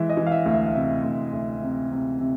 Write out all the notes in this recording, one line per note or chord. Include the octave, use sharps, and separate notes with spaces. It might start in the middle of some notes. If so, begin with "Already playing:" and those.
Already playing: E3 G#3 E5
D#5
E3
F5
E5
D2
E5
F5
C3 E5
D2
D2
C3
C3
C3